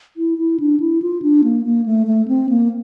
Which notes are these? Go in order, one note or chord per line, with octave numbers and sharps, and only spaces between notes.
E4
E4
D4
E4
F4
D4
A#3
A#3
A3
A3
C4
A#3